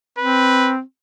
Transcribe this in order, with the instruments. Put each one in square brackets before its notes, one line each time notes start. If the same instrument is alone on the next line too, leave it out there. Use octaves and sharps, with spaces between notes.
[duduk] C4 [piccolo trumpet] B4